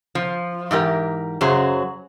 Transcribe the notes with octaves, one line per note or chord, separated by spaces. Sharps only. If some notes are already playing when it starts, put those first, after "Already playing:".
F3
G#2 E3 G4 A#4
F#2 C#3 F#3 G#4 C5